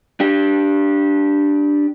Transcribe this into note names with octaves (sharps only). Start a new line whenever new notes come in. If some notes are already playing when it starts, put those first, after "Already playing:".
D4 G4